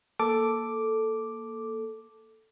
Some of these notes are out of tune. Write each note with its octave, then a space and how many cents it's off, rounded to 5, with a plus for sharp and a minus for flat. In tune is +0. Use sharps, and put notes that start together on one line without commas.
A#3 +0 A4 +0 D6 +0